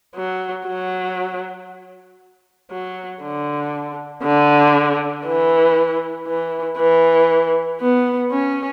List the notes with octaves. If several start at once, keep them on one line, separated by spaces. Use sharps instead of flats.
F#3
F#3
F#3
D3
D3
E3
E3
E3
B3
C#4